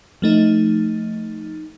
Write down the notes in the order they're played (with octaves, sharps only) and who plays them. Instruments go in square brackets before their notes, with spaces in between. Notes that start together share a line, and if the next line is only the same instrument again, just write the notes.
[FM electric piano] F3 A3 D#4